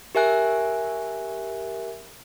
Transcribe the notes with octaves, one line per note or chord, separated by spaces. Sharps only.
G4 A#4 E5 G#5 F#6